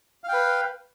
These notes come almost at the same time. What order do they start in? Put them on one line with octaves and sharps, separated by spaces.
F5 G5 B4